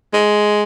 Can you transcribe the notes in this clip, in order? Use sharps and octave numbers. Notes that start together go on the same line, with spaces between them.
G#3